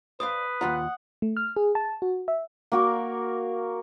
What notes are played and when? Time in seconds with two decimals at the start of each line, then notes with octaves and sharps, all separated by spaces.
0.20 B4 C5 D5 F5 D#6
0.61 D#2 F4 F#5 A#5
1.22 A3
1.37 F6
1.56 G#4
1.75 A5
2.02 F#4
2.28 E5
2.72 A#3 F#4 A#4